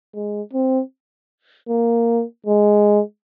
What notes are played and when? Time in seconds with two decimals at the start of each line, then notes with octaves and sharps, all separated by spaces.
0.15 G#3
0.54 C4
1.69 A#3
2.47 G#3